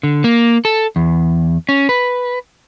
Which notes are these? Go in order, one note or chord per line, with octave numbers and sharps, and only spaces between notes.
D3
A#3
A4
E2
C#4
B4